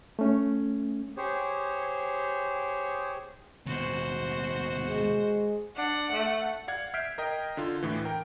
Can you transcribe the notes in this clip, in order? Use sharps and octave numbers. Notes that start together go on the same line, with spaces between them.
A3 C#4
G4 G#4 C5 C#5
D#2 B2 F#4 C5
G#3
D4 F#5
A3
D5 F5 F#5 G#6
E5 F6 G6 B6 C7 D7
A#4 D#5 G5
D3 F4
D2 A2 E3
A#4 G5